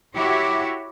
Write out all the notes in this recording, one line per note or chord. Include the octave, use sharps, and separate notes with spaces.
E4 F#4 G4 C#5 E5